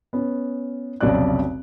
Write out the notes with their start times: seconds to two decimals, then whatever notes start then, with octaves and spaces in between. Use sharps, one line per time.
0.13 B3 C#4
1.01 F1 B1 C#3 C#5 D5 F#6